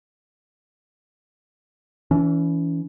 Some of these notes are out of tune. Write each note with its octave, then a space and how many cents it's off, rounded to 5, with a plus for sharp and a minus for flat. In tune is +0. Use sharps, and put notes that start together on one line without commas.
E3 +0 C#4 +35